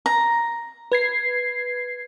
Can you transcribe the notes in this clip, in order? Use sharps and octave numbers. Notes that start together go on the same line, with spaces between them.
A#5
B4 G#6 C7